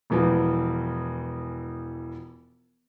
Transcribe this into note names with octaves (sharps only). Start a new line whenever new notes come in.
E1 E3 F3